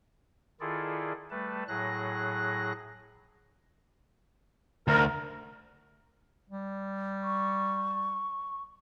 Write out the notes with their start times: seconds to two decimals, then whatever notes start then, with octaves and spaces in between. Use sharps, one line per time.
0.60 D#3 E4 F4 G#4 A4 D5
1.30 G3 A3 B4 A5
1.68 A2 F#3 G#4 F#6 A#6
4.88 D2 A#4
6.50 G3
7.23 C#6